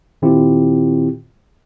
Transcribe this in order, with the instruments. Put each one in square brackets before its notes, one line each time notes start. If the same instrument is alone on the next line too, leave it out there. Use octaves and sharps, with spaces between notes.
[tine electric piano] A#2 D#3 C4 E4 F4 G4